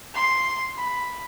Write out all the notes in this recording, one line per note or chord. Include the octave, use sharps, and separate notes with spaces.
C6
B5